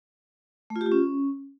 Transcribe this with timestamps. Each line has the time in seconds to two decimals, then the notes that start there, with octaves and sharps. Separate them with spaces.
0.70 A3
0.76 F4
0.81 G4
0.86 F4
0.92 C#4